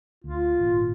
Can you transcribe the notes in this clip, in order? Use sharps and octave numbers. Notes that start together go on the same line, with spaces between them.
D2 F4
G#1 A#2